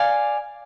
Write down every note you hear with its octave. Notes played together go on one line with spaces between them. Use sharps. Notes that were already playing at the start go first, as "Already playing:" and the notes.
Already playing: D5 F5 G#5